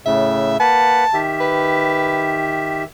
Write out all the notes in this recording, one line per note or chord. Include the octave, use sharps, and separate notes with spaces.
A2 C#3 E5
A#3 B4 F#5 A5
D#3 G4 E5
B4